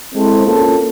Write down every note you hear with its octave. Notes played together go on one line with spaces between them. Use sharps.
G#3 C4 E4 A4 C5
A#3 C#4 F4 A4